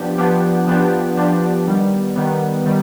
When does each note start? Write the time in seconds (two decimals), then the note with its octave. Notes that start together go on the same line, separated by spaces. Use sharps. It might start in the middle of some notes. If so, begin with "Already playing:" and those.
Already playing: F3 B3 D4 G4
0.18 F3 B3 D4 G4
0.67 F3 B3 D4 G4
1.17 F3 B3 D4 G4
1.66 D#3 G3 B3
2.16 D#3 G3 B3
2.66 D#3 G3